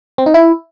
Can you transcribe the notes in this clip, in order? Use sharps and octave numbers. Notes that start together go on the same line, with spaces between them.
C4
D#4
E4